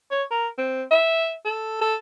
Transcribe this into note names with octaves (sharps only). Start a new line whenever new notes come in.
C#5
A#4
C4
E5
A4
A4